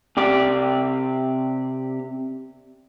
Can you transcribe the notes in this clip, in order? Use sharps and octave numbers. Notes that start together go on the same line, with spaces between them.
C3 G4 D5